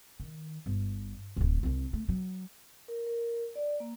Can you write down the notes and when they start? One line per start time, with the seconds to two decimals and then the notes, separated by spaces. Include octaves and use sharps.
0.20 D#3
0.66 G1
1.37 D1 G#1
1.63 C2 C4
1.93 A3
2.09 F#3
2.88 A#4
3.07 A#4
3.55 D5
3.80 A#3